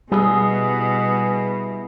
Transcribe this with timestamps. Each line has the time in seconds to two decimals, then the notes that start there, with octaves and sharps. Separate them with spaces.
0.12 B2 G3 B3 E4 G#4 D#5